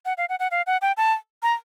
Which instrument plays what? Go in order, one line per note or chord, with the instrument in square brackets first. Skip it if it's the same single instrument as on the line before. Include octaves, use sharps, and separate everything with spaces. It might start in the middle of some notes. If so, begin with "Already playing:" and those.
[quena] F#5
F5
F#5
F#5
F5
F#5
G5
A5
A#5